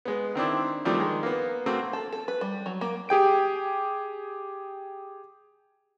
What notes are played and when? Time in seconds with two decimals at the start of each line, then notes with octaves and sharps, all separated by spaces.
0.05 G#3 B3
0.35 D#3 C4 D4 E4
0.85 D#3 F3 G3 A3 C4 D4
1.00 D#3 G#3
1.23 A#3 B3
1.66 A3 A#3 C4 F#4
1.93 A4
2.12 A4
2.28 B4
2.41 G3
2.66 F#3
2.81 A#3
3.09 G4 G#4 G5 D7